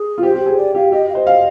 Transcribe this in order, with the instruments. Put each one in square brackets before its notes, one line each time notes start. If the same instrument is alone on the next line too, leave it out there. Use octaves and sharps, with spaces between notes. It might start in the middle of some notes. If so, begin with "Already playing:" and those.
Already playing: [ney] G#4
[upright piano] F4
[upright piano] G4 [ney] C5
[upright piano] G4
G#4
[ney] D5
[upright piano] G4 [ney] F5
[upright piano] G4 [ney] D#5
[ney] F5
[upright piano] C5 [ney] D#5
[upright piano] F5